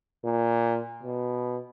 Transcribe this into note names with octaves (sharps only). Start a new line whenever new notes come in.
A#2
B2